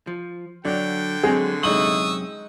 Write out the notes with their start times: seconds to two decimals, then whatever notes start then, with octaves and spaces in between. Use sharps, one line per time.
0.07 F3
0.65 D3 F#3 D4 G5
1.23 F#3 G#3 C4 G#4
1.63 F#2 C3 G#3 D#4 C#6 D#6 E6 F#7